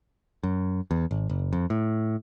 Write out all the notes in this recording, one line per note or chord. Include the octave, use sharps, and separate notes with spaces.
F#2
E2
G#1
F#1
F2
A2